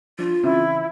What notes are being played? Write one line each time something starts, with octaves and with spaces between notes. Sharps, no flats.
F3 D4 F4
C#3 E3 C4 E4